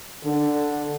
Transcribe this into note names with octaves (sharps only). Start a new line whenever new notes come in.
D3